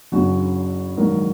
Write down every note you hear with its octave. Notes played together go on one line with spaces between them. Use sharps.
F#1 F#2 C#3 F#3 F#4
A#1 G#2 D#3 F#3 A#4